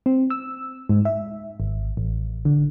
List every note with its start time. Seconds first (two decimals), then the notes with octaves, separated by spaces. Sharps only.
0.06 C4
0.30 E6
0.89 G#2
1.05 E5
1.60 G#1
1.97 A1
2.45 D3